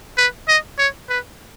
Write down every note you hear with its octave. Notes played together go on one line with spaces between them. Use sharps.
B4
D#5
C#5
B4